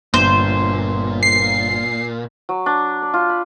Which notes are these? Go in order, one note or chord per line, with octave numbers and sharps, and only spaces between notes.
G1 A#2 C5
C7
F#3
D4
D5
F4
B5